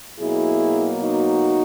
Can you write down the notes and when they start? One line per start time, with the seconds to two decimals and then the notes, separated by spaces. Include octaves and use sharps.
0.20 B2 F#3 A#3 E4 G#4
1.00 D#4 F#4